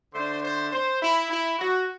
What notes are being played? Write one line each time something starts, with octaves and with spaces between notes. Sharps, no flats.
D3 A3 D4 C5
C5
C5
E4
E4
F#4